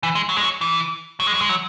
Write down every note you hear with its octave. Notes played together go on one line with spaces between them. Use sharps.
E3
G#3
F#3
G#3
F#3
E3
F#3
G#3
F#3
G#3
F#3